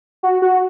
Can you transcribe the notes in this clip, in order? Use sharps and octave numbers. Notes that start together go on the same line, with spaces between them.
F#4
F#4